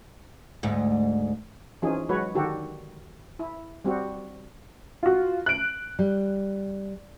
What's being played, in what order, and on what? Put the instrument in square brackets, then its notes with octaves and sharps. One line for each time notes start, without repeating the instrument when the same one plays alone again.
[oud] D2 G#2
[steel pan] E3 F3 C#4 D#4 G#4
F#3 G#3 F#4 B4 C#5
D3 D#3 F#4 G4 A4
E4
G3 C4 F#4
[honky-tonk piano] F4 F#4
F#6 D7
[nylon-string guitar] G3